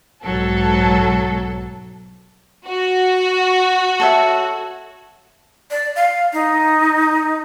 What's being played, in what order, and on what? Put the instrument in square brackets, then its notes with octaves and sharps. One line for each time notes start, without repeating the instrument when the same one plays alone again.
[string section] B1 G#2 A4 [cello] F#3
[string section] F#4
[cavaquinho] A4 C#5 E5
[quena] D5
F5
D#4